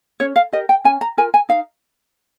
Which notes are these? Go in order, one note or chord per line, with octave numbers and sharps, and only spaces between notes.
C#4 C#5
F5
G4 A#4 D#5
G5
C#4 G#5
A#5
F4 A#4 G#5
G#5
D#4 F5